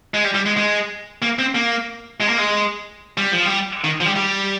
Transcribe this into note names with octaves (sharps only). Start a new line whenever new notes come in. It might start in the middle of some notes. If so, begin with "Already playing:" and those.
G#3
G3
G3
G#3
G#3
A#3
C4
A#3
G#3
A#3
G#3
G3
F3
G3
D#3
F3
G3
G3